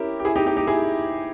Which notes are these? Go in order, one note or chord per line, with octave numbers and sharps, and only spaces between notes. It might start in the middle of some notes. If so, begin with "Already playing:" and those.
Already playing: C#4 E4 G4 A#4
G4
E4 G#4
D#4 G4
D#4 G4
D#4 G4
E4 G#4